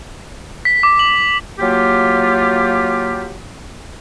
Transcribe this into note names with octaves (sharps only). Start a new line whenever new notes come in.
B6
D6
F#7
F#3 A#3 F4 G4